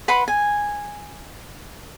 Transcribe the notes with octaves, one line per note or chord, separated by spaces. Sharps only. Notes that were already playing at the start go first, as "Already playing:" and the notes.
B4 F#5 B5 C6
G#5